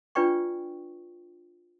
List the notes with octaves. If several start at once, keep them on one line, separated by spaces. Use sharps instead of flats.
D4 F4 B4 D5 G5 C#6